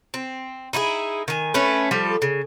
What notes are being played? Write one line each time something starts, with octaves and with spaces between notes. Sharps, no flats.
C4
D#4 E4 F#4 G#4
D#3 G#5
A3 C#4 B4
F3 G3 A4
C#3